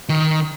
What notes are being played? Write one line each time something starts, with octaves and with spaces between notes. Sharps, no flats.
D#3